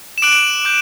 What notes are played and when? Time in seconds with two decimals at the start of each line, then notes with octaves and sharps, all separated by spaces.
0.18 E7
0.22 D6 F#6 D7 F#7
0.65 D6 G6